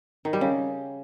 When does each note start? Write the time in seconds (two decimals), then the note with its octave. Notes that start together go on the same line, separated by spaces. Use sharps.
0.25 D#3
0.33 G3
0.41 C#3